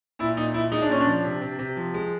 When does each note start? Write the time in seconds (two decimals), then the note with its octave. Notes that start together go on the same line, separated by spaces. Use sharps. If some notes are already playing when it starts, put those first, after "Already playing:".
0.19 A#2 E4
0.37 A#2 D#4
0.54 A#2 E4
0.72 G#3 D#4
0.82 D4
0.89 A#2 C#4
1.01 D4
1.07 F3
1.24 C3
1.42 C3
1.59 C3
1.77 F3
1.94 G#3